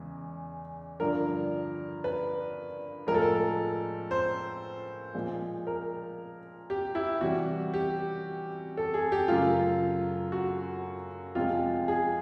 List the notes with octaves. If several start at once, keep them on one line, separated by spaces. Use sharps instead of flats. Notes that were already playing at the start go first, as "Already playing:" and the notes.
Already playing: E2 C#3 E3 G#3
G2 D3 F3 A#4
B4
A2 F3 G#3 A#4
A4
A#4
C5
A#2 F3 G#3
A#4
G4
E4
C3 E3 G3 F#4
G4
A4
G#4
G4
F#2 C#3 F#3 A3 F4
F#4
F2 C3 F3 G#3 F4
G#4